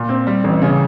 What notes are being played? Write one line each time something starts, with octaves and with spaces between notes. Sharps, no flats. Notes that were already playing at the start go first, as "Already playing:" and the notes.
Already playing: A#2
C4
G3
A1
C#3